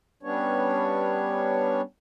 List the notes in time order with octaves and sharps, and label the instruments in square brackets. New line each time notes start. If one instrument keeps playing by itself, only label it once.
[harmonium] G3 B3 C#4 D4 C#5